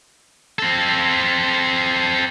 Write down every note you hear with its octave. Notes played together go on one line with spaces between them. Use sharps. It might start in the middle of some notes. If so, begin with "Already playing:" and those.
C4 A4